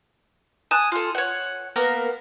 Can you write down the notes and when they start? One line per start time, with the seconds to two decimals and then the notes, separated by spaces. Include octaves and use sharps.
0.71 G#5 A5 D#6 F#6
0.92 F4 A4
1.15 C#5 F#5
1.76 A#3 B3 A#4